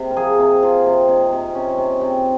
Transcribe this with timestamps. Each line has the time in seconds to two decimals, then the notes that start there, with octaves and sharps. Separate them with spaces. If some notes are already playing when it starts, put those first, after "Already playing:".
Already playing: C3
0.11 A#4
0.16 F3 G#4
0.39 C3
0.63 C3 F4
0.86 C3
1.08 C3 D#4
1.33 C3
1.55 C3 C#4
1.78 C3
2.01 C3 C4